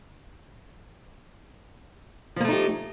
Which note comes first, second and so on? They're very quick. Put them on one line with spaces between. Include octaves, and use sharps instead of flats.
F3 A#3 A3 D#4 G4